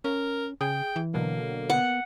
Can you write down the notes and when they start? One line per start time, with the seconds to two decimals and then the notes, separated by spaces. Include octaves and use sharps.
0.04 C#4 A#4
0.61 C#3 G#4 G5
0.96 E3
1.14 B2 D3 F#3 A#3
1.70 B3 F#5